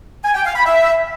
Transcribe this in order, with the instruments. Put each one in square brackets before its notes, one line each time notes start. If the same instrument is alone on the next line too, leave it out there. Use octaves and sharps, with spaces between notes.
[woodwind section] G#5
G5
F5
B5
E5